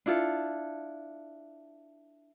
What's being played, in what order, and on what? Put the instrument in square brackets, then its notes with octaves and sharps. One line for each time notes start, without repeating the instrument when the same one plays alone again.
[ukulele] D4 E4 F4 A4